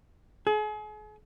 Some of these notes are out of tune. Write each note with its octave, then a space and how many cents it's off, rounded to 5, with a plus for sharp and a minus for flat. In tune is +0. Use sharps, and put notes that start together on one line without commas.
G#4 +40